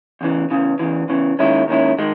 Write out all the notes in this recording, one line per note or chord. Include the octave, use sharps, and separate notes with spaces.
E2 C#3 E3
E2 C#3 E3
E2 C#3 E3
E2 C#3 E3
D#2 D#3 G#3 C#4 E4
D#2 D#3 G#3 C#4 E4
D#3 G#3